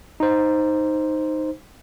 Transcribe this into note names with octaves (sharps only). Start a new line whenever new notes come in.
D#4 C5